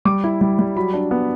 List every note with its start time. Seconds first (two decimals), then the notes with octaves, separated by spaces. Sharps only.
0.05 G3 D6
0.24 E4
0.41 G3
0.59 G3
0.76 F#3 B5
0.94 D4
1.11 B3